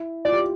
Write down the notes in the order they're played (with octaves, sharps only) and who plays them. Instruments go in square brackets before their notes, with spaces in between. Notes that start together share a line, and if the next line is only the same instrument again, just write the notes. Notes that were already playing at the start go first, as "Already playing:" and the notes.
Already playing: [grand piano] E4
[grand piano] F4 [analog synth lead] D5
[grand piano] G4